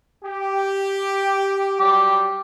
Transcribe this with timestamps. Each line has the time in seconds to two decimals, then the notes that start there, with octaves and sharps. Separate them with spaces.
0.25 G4
1.79 F#3 G3 G4